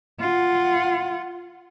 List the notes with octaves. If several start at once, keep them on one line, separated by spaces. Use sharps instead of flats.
F4 F#5